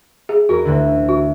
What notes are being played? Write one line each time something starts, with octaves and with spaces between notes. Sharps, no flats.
G#4
E2 C#4 F#4 A#4
D2 A2 D3
F#4